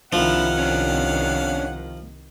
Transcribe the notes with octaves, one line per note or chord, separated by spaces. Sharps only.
C2 D#3 F3 D4 E4 F5 F#5
C#4 D4